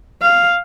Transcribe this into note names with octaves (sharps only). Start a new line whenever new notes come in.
F5